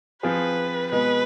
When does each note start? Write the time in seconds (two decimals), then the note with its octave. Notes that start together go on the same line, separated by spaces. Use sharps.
0.23 F3 C4 F4 G#4 B4
0.92 B2 G#3 B3 B4